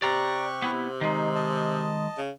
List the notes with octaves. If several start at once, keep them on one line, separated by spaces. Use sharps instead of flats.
C3 G4 D5 A#5 C#6 F#6
B3 E4
D#3 G#3 D#4
D#5 A5
C#3